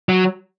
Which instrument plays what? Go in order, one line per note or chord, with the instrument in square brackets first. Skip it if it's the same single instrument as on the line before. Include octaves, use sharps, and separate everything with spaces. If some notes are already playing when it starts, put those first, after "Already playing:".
[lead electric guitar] F#3